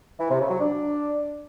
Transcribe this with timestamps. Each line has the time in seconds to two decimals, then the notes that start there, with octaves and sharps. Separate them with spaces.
0.19 E3
0.29 C3
0.39 C#3
0.50 F#3
0.60 D4